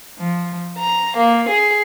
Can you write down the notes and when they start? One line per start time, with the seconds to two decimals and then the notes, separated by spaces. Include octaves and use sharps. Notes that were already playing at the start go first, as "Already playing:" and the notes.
0.18 F3
0.77 A#5
1.16 A#3
1.48 G#4